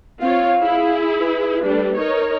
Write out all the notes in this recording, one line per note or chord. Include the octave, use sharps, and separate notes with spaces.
C4 F4 C#5 F5
E4 G#4
B4
G3 A3 D4
D#4 A#4 C#5